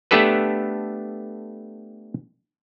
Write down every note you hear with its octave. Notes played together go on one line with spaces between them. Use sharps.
A3 B3 D4 G4 A4 B4